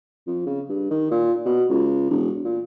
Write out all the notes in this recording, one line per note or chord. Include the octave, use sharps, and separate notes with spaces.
F2
C#3
G2
D#3
A#2
B2
C#2
E1
A#2